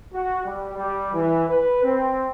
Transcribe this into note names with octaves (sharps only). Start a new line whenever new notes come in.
F#4
G3
G3
E3
B4
C4